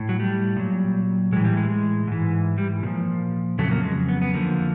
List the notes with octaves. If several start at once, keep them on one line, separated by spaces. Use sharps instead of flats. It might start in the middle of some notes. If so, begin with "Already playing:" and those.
Already playing: A2
F#3
G3
A#2 F#3
A2 E3 G#3
G3
G#3
G#3
G#2 E3
G3
A#2 F3
F2 C#3 F#3 A3
A#3
G#3
B3
B3
F2 D3 F3 A#3